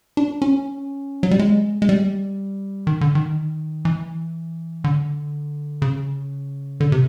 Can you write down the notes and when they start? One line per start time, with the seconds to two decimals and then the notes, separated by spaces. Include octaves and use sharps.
0.17 D4
0.42 C#4
1.23 F#3
1.31 G3
1.39 G#3
1.82 G#3
1.89 G3
2.87 D#3
3.01 D3
3.15 D#3
3.85 E3
4.84 D3
5.82 C#3
6.80 D3
6.92 C3